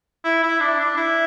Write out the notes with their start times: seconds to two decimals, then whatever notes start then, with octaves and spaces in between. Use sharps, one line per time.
0.25 E4
0.43 E4
0.60 D4
0.79 D4
0.97 E4